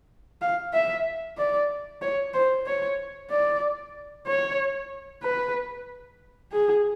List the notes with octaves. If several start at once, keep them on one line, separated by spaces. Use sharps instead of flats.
F5
E5
D5
C#5
C5
C#5
D5
C#5
B4
G#4